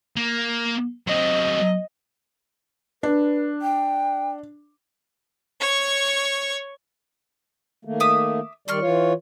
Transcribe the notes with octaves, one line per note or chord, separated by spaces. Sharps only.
A#3
F#3 C4 D#5
D4 B4
G5
C#5 C#6
D#3 A3 A#3
E5 D6 D#6
D#3 G3 D5 C6 C#6 F6
E3 F4 C#5